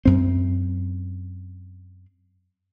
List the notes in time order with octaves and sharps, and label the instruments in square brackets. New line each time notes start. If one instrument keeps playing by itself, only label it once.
[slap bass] F#2 C4